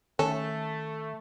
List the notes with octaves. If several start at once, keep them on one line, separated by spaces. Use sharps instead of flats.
D#3 A3 C#4 A4